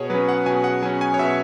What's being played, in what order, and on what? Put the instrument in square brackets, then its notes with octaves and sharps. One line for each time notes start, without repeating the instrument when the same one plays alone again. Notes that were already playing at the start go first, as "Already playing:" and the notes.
Already playing: [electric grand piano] B2 G#4 C#5
F#3 C#4 B4
F#5
B2 G#5
F#5
F#3 C#4 G#5
G#5
C#5
B2 E5